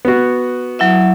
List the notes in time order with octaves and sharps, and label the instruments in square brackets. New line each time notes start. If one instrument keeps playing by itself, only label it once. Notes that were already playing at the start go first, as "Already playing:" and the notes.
[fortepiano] B3 F#4
[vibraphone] F#3 E4 E5